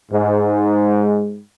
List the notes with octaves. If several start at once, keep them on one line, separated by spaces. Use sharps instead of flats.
G#2